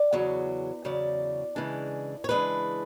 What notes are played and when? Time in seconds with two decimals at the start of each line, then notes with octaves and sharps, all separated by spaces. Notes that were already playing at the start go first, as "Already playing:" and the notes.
Already playing: D5
0.13 E2 C#3 F#3
0.85 E2 C#3 F#3 D5
1.56 C#3 E3 G#3 D4
2.24 C#5
2.29 C#3 E3 G#3 D4 B4